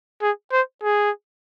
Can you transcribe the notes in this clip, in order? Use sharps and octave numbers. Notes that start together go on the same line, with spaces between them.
G#4
C5
G#4